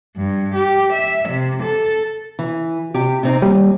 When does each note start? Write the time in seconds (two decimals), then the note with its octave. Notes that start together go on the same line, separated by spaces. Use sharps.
0.17 G2
0.55 G4
0.93 E5
1.30 C3
1.64 A4
2.39 E3
2.94 C3 G4
3.23 C3 C4 D#4
3.42 D#2 G3